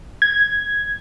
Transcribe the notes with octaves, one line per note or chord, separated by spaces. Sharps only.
G#6